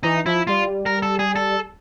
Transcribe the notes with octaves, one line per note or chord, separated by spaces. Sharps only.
E3 D#4
F3 E4
G3 F4
A#4
A4
G#4
A4